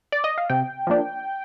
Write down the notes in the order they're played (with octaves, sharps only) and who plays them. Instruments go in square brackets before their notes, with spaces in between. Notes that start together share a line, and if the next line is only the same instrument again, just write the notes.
[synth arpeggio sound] D5
D#5
F5
C3 G5
F3 A#3 D4